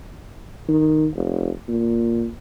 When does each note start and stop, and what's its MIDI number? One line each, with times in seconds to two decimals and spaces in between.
0.68 1.07 51
1.15 1.49 29
1.68 2.28 46